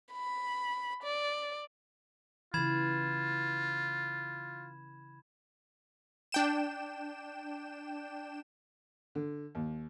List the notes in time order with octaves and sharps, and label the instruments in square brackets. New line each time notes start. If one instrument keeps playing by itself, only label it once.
[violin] B5
D5
[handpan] C#3 E3 [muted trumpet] F4 [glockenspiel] B5 G#6 E7
[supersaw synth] D4 G5 E7
[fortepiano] D3
D#2